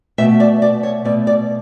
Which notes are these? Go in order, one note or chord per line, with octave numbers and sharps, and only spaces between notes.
B2 A3 E5
D5
D5
C#5
B2 A3 D5
D5